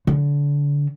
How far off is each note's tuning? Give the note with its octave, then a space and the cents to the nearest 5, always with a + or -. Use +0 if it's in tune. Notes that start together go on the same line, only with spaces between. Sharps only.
D3 -30